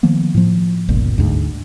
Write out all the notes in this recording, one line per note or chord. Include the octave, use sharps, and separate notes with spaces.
D#3 F3 A#3 B3
A2 F3
G1 C#2 A#2
D2 G#2